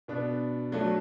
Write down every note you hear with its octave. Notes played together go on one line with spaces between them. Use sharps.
B2 B3 D4
F#3 A3 D4 F#4 A4